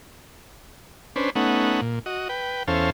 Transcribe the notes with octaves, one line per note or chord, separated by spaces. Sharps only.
C#4 D4 B4 C5
A3 B3 C#4 D#4 F#5
A#2
F#4 D#5
B4 G5
E2 C#4 A4 C5 F5